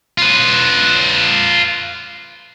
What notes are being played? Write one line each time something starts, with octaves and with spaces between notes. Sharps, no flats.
F4 B4